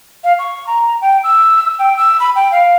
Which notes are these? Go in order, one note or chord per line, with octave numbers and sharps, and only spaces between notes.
F5
C#6
A#5
G5
E6
G5
E6
B5
G5
F5